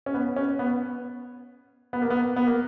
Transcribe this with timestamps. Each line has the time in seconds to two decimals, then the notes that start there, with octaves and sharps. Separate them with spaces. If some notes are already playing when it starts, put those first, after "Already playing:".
0.06 C#4
0.14 B3
0.36 C#4
0.59 B3
1.93 B3
2.02 A#3
2.10 B3
2.36 B3
2.47 A#3